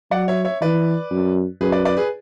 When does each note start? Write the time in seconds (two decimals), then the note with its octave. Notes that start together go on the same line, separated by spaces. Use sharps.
0.11 F#3 D5 F#5
0.28 C#5 E5
0.45 C#5 E5
0.61 E3 B4 D5
1.10 F#2
1.60 F#2 G#4 B4
1.72 B4 D5
1.85 B4 D5
1.97 G#4 B4